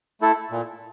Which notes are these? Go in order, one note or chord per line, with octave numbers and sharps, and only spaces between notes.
A3 E4 A4
A#2